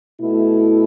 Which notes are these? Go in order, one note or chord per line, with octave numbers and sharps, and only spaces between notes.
B2 A3 E4